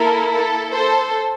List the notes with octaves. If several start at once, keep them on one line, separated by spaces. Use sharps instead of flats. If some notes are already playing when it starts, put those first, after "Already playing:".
Already playing: A#3 E4 A4 A#4
A4
A4 C5